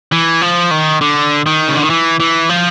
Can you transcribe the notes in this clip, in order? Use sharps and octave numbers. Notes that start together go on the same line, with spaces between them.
E3
F3
D#3
D3
D#3
C#3
D3
D#3
E3
E3
F3